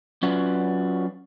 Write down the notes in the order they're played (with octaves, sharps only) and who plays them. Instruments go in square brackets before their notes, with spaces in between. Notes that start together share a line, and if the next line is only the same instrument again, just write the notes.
[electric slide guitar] F#3 C#4 F4 F#4 B4 D5